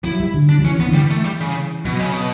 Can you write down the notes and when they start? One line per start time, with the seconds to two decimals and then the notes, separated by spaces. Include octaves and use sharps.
0.04 F#3 E4
0.20 G3
0.34 D3
0.49 D4
0.59 F#3
0.64 E3 C#4
0.79 E3 B3
0.89 D3
0.94 G3
0.98 E3
1.10 A3
1.25 G3
1.40 C#3
1.85 B2 F#3
1.99 C#3
2.13 B2